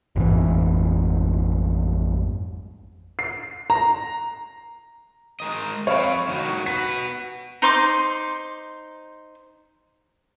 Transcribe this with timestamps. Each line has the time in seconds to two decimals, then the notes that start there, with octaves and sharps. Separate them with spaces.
0.16 A1 F2 G#2 E3
3.19 C7
3.70 A#5
5.40 G#3 A#4 D#5
5.87 F2 C4 C#5 F5 B5
6.29 D#3 F#3 F#4
6.66 F#4 B4 B6
7.62 D#4 C5 C6 D6